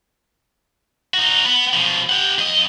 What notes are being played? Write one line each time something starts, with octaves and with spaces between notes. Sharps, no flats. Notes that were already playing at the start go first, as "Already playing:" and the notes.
D#4 F#4
B3
B2 F3
G4 F#5
F2 D#5